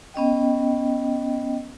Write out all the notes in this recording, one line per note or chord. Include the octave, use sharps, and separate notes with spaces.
B3 C#4 D#5 G5